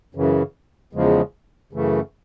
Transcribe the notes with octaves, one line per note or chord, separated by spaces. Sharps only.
F#2 C#3 E3
E2 C#3 F3 G#3
F#2 C#3 E3 A3